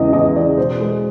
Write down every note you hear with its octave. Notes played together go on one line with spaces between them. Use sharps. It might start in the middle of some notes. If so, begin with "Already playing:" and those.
Already playing: E2 C#3 E3 G#3 D#5
E2 D#5
C#3 E3 G#3 D5
B2 C5
G#3